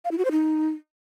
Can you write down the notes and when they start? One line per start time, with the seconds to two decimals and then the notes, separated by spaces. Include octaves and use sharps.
0.05 F5
0.11 E4
0.18 F#4
0.25 C5
0.32 D#4